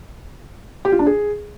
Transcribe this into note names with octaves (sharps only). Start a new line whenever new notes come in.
G4
F4
D4
G#4